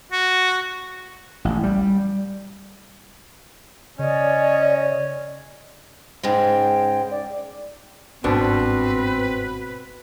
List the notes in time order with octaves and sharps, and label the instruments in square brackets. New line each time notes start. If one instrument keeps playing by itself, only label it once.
[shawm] F#4
[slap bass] A1
G3
[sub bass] C#3 [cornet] C#4 [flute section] D5 [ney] D#5
[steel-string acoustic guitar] G#2 C#3 G#3 [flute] G5
[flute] D5
[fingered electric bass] G1 G#2 [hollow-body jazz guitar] B2 D4 [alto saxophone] C4 [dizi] B4